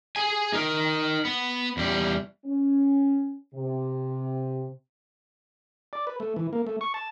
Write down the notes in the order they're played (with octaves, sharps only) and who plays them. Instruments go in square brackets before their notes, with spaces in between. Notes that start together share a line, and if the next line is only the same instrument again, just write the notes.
[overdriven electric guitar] G#4 G#5
D#4 A#4
B3
E2 G3
[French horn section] C#4
C3
[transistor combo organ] D5
B4
A3
E3
A#3
A3
C#6
A5